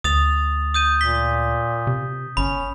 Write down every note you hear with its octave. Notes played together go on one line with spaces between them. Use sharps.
D2 D#6 A6 F7
D#6 G6 D#7
A#2 B6 G7
C3
G1 C#4 B5